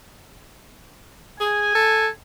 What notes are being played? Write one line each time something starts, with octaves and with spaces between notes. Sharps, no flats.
G#4 G#5
A4